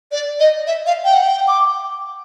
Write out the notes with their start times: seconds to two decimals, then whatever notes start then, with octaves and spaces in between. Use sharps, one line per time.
0.12 D5
0.40 D#5
0.67 E5
0.86 F5
1.04 G5
1.14 F#5
1.24 G5
1.48 D6